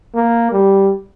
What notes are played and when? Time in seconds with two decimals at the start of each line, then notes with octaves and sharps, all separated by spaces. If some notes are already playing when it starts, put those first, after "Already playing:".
0.15 A#3
0.52 G3